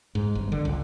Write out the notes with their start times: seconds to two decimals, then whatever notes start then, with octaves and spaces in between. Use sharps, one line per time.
0.15 G#2
0.35 G1
0.52 D3
0.65 C#2